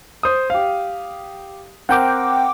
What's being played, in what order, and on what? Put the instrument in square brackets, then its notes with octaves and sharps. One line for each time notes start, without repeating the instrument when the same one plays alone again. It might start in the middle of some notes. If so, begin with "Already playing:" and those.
[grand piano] C5 D#6
G4 F5
[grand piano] C4 A#4 [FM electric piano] F#5 G5 D6